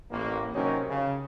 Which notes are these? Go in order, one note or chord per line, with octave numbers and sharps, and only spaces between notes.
A1 A#3
C3 F#3 C#4 D#4 F#4 A#4
C#3